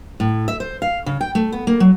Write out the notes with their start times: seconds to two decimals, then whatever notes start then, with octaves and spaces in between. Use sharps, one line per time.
0.20 A2
0.48 E5
0.60 C5
0.82 F5
1.06 C#3
1.21 G5
1.35 A3
1.52 B3
1.67 A#3
1.80 F#3